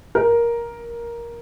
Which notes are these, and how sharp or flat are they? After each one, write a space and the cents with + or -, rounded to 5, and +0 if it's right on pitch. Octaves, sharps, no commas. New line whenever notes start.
A#4 +10